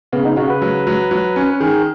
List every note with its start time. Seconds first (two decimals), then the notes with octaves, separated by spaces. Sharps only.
0.13 C#3 B3
0.25 D#4
0.37 C#3 F#4
0.50 B4
0.62 F#3
0.87 F#3
1.11 F#3
1.36 C#4
1.60 D#3 G#4